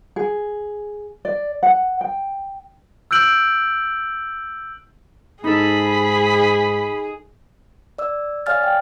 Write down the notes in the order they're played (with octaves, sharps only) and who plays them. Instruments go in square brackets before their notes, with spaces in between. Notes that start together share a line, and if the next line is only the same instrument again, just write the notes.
[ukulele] G#4
D5
F#5
G5
[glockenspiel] E6 F#6 G6 D7 F#7
[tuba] G#2 [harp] D#4 A4 [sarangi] G#4 [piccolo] B5
[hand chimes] D5 E6
C#5 D5 F5 G#5 F6 A6
G5